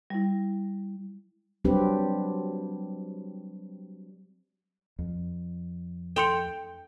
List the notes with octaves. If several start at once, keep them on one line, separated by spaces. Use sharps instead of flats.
G3 E4
F#3 G3 C4 D4 G4 B4
F2
A4 G5 C6 C#7